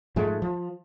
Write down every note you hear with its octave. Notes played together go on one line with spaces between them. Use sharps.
G#2 F3 G#3 A3
F3